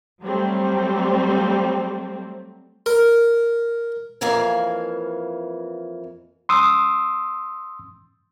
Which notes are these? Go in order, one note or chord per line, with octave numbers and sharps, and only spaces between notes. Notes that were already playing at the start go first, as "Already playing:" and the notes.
F#3 G3 A3 C4
A#4
F2 E3 A#3 F5 G#5
C6 D#6 E6